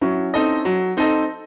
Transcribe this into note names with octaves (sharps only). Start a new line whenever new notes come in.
F#3 C#4 E4
C4 D#4 A4 D#5
F#3
C4 D#4 A4 D#5